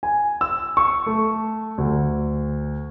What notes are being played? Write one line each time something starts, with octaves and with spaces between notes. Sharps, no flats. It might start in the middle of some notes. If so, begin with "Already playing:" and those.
G#5
E6
C#6
A3
D2